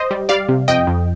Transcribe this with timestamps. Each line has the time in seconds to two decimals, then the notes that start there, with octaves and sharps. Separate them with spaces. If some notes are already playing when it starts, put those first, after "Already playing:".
Already playing: C5 D#5
0.11 G3
0.29 G3 D5 F5
0.49 C3
0.68 F2 D#5 G5
0.87 F2